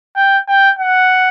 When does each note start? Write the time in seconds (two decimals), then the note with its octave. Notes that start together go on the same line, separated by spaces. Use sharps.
0.16 G5
0.48 G5
0.79 F#5